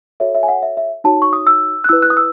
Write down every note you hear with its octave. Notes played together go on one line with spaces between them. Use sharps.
F#4 A4 C#5 E5
E5
G#5
F#5
E5
E5
D#4 F#4 C#5 A5
C#6
D#6
E6
F#6
E4 B4 E6
F#6
D#6
E6